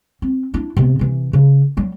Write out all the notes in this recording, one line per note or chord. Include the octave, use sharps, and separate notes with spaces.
C4
D4 E4
C3 B3
C3 E3
C#3
F#3 G3